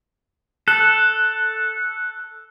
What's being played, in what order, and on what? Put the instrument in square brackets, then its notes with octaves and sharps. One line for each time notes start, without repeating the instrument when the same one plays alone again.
[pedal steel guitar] A4 [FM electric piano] F#6